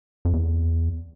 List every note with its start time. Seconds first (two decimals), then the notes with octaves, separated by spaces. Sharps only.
0.25 F2
0.33 E2